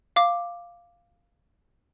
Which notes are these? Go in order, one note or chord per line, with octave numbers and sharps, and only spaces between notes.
F5 D6